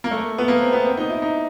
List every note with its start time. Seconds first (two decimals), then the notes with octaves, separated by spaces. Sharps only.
0.04 A#3
0.11 A3
0.38 B3
0.48 A#3
0.61 C4
0.73 B3
0.85 C4
0.97 D#4
1.10 E4
1.22 D#4